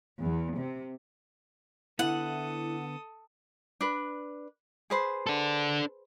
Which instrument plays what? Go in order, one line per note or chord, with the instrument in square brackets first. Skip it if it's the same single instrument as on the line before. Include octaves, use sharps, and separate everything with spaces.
[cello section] E2
C3
[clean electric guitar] D3 B3 [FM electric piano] E4 [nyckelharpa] A4 D#6 [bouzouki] F#5
[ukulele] D4 B4
G#4 B4 C5
[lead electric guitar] D4 A4